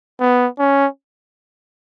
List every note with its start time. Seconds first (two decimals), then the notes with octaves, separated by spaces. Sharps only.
0.20 B3
0.59 C#4